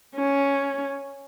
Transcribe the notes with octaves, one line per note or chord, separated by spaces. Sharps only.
C#4